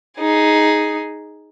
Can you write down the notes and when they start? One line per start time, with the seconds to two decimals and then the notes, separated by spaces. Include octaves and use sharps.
0.19 D#4 G#4